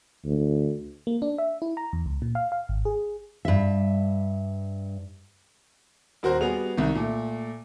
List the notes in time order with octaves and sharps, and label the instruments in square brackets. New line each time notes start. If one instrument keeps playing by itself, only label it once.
[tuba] D2
[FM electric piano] A#3
D4
E5
E4
A#5
E2
C#2
A#2
F5
F5
G#1
G#4
[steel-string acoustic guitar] G2 E5
[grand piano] D#1 F#4 A#4 C5
G3 B3 F#4 G#4 F7
C2 D#3
A#2 A3